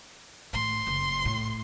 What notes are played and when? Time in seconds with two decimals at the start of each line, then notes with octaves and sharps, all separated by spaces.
0.53 A2 D#3 C6
0.87 F#1
1.25 A2